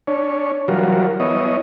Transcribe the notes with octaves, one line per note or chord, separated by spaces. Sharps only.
D4 C#5
E3 F#3 G3 F4 F#4 A#4
B3 E4 C#5 D#5